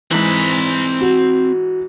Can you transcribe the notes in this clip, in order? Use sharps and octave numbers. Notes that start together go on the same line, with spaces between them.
G#2 E3 C4 B5
F#4